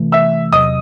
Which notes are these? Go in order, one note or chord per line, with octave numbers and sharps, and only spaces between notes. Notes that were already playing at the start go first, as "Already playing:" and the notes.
Already playing: C3 E3 A3
E5 E6
E2 C3 F#3 D#5 D#6